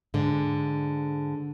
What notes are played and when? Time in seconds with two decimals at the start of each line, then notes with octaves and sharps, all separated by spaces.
0.14 G#2 D3